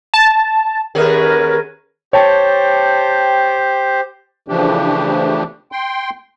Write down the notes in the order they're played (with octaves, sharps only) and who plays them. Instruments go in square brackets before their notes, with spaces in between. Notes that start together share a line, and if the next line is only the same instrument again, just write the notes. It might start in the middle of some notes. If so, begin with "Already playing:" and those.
[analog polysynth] A5
[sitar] D#2 C#4 G#4 [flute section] A#4 B4
[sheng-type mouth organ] G4 C5 [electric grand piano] C#5 G5 A5
[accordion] C#3 E3 F3 A3 D4 G4
G5 C6